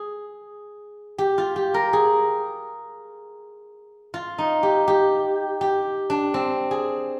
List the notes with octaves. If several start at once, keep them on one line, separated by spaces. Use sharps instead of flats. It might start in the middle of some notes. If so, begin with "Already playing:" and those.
Already playing: G#4
G4
F4
G4
A#4
G#4
F4
D#4
G4
G4
G4
D4
C4
G#4